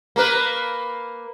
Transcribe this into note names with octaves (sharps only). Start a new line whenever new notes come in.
A#3 A#4 B4